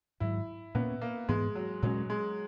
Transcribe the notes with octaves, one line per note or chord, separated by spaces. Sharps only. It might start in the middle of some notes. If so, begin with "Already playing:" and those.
G#2 D#3 F#3 E4
A#2 A#3 B3 C#4
A#3
G#2 E3 G#3 B3
F#3
A#2 F#3 G#3 C#4
G#3